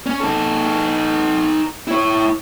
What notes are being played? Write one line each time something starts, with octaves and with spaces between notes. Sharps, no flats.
C#4
D#4 A4
E4 C#5